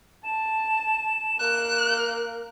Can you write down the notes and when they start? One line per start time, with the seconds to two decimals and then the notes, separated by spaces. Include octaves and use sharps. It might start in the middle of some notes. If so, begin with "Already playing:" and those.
0.25 A5 E7
1.40 A#3 A#4 F#6